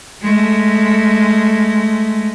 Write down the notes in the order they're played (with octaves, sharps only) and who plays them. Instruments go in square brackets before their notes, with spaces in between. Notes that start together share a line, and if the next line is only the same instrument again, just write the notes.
[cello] G#3 A3